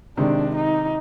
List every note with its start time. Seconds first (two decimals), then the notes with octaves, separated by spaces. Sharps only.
0.17 C3 D#3 G#3 D4
0.56 D#4